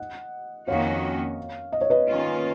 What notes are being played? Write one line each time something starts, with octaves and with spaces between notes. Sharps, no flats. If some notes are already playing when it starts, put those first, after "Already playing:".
Already playing: D#5 F#5
F2 D#3 A#3 C#4 F#4 C#5 F5
D#5
C#5
B4 D#5
D#3 A#3 C#4 F4